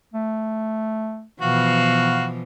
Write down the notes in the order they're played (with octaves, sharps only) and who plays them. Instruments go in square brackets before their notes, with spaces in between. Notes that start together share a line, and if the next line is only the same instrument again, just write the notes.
[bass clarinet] A3
[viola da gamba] B2 E3 F3 [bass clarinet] B3 [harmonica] F#4 F5